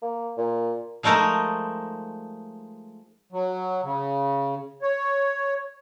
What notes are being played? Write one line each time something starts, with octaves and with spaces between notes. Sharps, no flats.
A#3
A#2
F3 G#3 A3 D#4 A#4
F#3
C#3
C#5